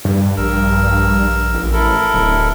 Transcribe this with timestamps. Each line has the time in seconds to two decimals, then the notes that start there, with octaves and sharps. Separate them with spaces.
0.05 G2
0.37 A#1 A#4 E6
1.54 A1
1.73 E4 A4 A#4
2.13 D1